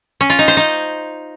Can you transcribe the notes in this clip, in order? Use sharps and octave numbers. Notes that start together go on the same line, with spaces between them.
C#4
F4
D#4
C5
D#4